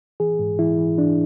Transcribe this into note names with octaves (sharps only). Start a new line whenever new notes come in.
E3 G#4
G#2
E3 E4
E3
E3 D4